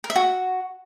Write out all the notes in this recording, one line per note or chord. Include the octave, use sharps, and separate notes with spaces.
A#4
E5
F#4